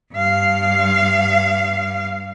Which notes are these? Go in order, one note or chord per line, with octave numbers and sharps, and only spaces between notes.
G2 F5